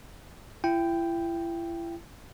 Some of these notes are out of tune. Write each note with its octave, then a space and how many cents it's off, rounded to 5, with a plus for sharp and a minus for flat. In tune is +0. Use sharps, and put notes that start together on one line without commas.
E4 +35 G5 +0